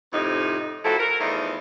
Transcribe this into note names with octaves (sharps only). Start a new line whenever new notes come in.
F2 A2 C3 D#4
F3 E4 F#4 A4
A#4
E2 F3 A3 D#4 A4